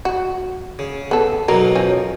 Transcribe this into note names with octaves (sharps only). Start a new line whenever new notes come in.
F#4
C#3
B3 A4
B1 B2 F#3 A#4
F3 C#4